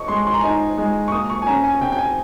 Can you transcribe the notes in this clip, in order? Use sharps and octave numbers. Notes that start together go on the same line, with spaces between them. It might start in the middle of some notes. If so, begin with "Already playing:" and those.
Already playing: D#5 C#6
G#3 C6
C6
A#5
D#4 G#5
A#5
G#3
C#6
A#3 D#6
C#6
G#5
C#4 A#5
G#5
C3 G5
G5
G#5